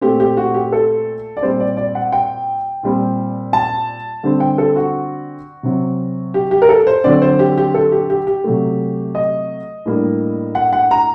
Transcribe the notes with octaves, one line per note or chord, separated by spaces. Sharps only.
A#2 A3 C4 G4
G4
F#4
G4
A4
D5
A#2 G3 C4 C5
D5
D5
F#5
G5
A#2 G3 C4
A5
D3 G3 C4
G5
A4
F#4
C3 F#3 C4
G4
G4
A#4
A4
C5
D3 F#3 C4 D5
C5
G4
G4
A4
G4
G4
G4
C3 F#3 A3
D#5
A2 G3 A#3 D4
F#5
F#5
A#5